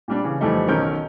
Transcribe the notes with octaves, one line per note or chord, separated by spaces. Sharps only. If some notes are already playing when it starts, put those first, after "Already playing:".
A#2 G3 D4
C#3 E3
F2 E3 G3 A3 D#4
B1 D#3 C#4 A#4 G6